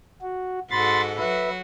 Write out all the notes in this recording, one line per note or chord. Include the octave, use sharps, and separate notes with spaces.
F#4
G#2 F#4 A4 B5 C6 A6
F#3 F#4 B4 E5